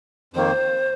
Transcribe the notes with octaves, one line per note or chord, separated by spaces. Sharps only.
F2 D#3 A#3 C5